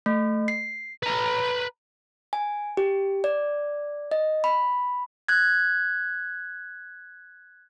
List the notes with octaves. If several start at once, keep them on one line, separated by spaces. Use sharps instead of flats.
A3
C7
B4 A#5
G#5
G4
D5
D#5
B5
F#6 G#6